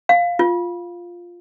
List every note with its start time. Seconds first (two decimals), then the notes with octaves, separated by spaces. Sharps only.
0.09 F5
0.39 F4